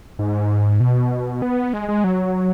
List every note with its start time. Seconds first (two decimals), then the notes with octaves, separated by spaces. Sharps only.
0.19 G#2
0.80 B2
1.42 B3
1.73 G#3
1.89 G#3
2.04 F#3